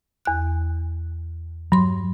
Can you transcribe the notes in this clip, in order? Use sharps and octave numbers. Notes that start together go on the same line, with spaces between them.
E2 F#6
G2 F#3 C6